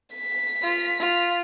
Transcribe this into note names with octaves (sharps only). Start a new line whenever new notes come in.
B6
F4
F4